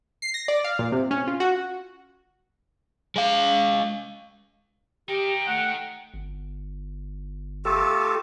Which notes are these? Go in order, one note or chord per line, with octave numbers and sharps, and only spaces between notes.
C7
A#6
D5
F5
A#2
C3
C#4
F4
F#4
G#3 F5
D#4 G4 A#4 G5
A3 F#5
G1
A3 F4 G4 A4